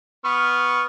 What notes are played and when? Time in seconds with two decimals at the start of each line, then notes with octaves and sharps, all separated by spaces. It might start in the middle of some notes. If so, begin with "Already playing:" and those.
0.25 B3 C#6 F6